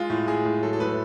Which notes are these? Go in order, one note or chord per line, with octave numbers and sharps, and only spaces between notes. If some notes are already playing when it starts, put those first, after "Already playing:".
Already playing: G#3 F4
A2
G#3 G#4
A2
F#3 A4
A4
A2 B4